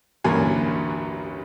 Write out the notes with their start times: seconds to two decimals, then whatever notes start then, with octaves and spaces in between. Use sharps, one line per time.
0.24 A1 D2 G2 F#3 A#3 G#5